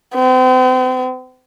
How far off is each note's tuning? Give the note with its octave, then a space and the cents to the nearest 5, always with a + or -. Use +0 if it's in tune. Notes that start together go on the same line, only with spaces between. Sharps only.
C4 -40